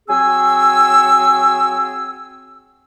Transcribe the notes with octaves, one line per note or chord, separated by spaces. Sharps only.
F#3 C4 G#4 G#5 E6